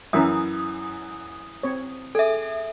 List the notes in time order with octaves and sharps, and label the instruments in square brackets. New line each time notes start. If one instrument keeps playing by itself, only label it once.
[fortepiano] F#2 E3 [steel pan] C#4 A#4 E5 [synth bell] D#6
[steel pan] C4 C#5
[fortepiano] G#4 [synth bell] A4 E5